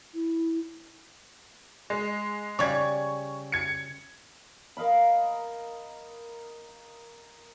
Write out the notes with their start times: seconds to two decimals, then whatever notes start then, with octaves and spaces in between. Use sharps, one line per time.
0.14 E4
1.90 G#3
2.59 C#3 G3 C#6 G#6
3.52 G#6 C#7
4.77 A#4 D#5 F5 B5